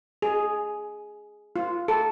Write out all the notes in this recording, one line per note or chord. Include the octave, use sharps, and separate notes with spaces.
G#4
F4
A4